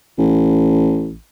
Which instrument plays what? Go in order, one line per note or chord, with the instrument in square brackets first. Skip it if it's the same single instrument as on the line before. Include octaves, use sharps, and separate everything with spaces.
[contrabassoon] A1